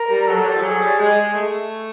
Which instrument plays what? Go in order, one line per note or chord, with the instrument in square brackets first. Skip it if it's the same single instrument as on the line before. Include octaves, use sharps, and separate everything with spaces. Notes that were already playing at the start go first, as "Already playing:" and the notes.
Already playing: [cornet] A#4
[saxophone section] G3
[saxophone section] F#3 [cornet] A4
[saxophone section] F#3
G3
F3
[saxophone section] F#3 [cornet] G#4
[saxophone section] G3
[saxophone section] G#3 [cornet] G#4
[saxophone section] A3